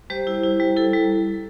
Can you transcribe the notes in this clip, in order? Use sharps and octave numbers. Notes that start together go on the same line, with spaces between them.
G3 G4 C5
E4
E4
G3
E4 A4
G3